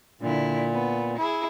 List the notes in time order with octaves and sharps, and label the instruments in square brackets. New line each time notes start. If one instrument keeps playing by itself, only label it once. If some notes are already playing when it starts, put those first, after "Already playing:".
[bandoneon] A#2 [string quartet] D3 E4
[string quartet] B3
E4 G#4